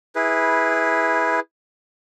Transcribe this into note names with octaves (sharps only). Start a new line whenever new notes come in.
E4 G#4 B4